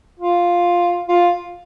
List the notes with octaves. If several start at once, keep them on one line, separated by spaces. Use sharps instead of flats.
F4
F4